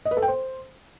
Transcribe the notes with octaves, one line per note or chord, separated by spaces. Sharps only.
D#5
B4
A4
G5
C5